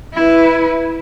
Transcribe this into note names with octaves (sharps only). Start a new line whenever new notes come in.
E4 B4